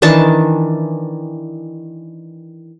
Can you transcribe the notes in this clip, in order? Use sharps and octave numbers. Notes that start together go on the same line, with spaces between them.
D#3 E3 D4 A5